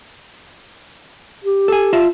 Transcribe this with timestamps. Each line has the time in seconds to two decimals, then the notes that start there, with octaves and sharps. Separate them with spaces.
1.45 G4
1.68 A4 G#5
1.93 F4 E5 A5